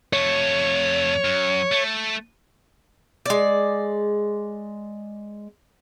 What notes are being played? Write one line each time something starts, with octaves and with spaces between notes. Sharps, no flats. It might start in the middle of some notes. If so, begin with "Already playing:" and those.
F2 A3 C#5
F#2
A3
G#3 D5